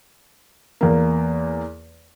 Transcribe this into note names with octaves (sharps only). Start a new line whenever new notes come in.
E2 A#3